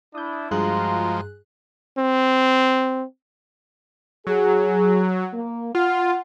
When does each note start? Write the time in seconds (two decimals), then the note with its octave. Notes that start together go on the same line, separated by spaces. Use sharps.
0.15 D4 E4 D#6 G6
0.51 G2 F3 G#3 F4 F#4 G#4 A#5 F#6
1.98 C4
4.27 F#3 G#4
5.34 A#3
5.75 F4 F#5